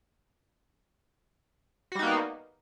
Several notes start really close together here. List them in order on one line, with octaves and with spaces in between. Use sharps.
F#4 G3 D#4 A#3 B3